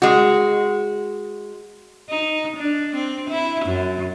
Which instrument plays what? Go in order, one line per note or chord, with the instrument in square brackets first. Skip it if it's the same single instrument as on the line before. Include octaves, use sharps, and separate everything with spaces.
[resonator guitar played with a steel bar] G#3 F#4
[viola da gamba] D#4
D4
C4
E4
F#2